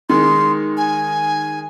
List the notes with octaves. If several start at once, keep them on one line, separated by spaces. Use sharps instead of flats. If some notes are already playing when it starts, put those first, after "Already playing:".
D#3 G#3 C6
G#5